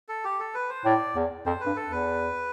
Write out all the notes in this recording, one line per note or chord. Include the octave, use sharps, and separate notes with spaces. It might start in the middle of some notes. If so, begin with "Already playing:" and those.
A4
G4
A4
B4
C5
A2 D5
E2
F2 C5
B4
G2
A4
E2
B4